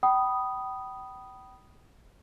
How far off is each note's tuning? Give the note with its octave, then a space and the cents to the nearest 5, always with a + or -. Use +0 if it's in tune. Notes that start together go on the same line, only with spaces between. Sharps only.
G5 -35 B5 -10 D#6 +0